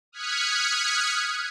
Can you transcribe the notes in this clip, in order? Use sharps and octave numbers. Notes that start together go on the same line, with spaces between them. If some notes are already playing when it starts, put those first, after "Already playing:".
D#6 F6 F#6 G#6 B6 C#7